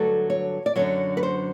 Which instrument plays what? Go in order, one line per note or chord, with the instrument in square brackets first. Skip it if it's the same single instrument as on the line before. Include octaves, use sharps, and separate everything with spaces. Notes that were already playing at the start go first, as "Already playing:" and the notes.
Already playing: [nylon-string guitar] G2 D3 F#3 A3 A4
C#5
D5
F#2 D3 F#3 C#5
B4
C5